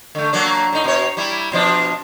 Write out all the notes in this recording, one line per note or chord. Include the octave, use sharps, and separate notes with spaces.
D3 A3
F#3 A#3 D4
A2 D#4
B2 C#5
G3 E4
B2 F3 D4